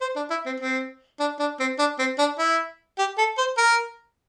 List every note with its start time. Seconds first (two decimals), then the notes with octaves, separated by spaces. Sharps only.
0.01 C5
0.16 D4
0.30 E4
0.46 C4
0.60 C4
1.20 D4
1.40 D4
1.60 C4
1.79 D4
1.99 C4
2.19 D4
2.39 E4
2.98 G4
3.18 A4
3.38 C5
3.57 A#4